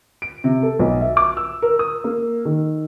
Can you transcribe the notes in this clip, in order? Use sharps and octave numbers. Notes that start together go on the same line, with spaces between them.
D7
C3
A4
B1
E5
D6
E6
A#4
D#6
A#3
D#3